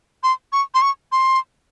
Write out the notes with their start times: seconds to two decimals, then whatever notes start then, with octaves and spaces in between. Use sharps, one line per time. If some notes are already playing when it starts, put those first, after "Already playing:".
0.23 C6
0.53 C#6
0.74 C6
0.82 C#6
1.12 C6